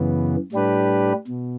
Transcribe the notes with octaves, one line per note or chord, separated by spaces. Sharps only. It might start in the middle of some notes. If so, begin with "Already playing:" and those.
Already playing: F#2 C#3 E3 B3
A2 G3 D4 G4 B4
B2